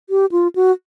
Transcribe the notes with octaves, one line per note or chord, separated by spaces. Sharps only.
G4
F4
F#4